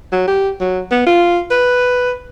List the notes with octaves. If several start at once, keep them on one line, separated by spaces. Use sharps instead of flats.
F#3
G4
F#3
B3
F4
B4